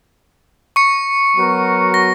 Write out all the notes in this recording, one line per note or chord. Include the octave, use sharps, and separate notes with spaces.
C#6 C#7
F#3 B3 F#4 A#4
A#6